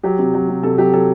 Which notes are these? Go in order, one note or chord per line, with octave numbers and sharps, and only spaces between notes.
F#3 G4
C3
F#3
C3
C3 A4
F#3 G4
F#3 A4